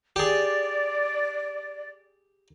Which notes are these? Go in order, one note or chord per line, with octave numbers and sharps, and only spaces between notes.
G4 G#4 D5